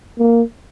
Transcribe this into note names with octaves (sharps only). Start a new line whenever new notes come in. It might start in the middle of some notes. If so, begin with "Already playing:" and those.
A#3